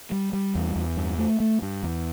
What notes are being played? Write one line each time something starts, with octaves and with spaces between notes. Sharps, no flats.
G3
G3
E2
E2
G2
A3
A3
G2
E2